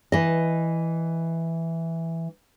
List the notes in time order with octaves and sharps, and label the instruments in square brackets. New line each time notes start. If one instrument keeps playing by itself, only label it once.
[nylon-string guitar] E3 D#5